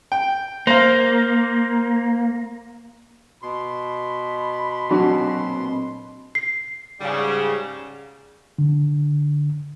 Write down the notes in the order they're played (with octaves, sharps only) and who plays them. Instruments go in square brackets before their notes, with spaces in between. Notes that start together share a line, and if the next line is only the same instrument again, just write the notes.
[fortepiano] G5
[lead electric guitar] A#3 [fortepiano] C5 F5
[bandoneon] B2 C6 [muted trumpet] B5
[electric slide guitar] A#2 C4 G#5 [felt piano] F#3 D4 F#4
[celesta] C7
[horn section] G#2 C#3 G3
[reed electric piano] D3